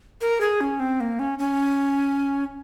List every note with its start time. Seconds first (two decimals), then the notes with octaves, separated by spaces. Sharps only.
0.21 A#4
0.41 G#4
0.61 C#4
0.80 C4
1.00 A#3
1.19 C#4
1.39 C#4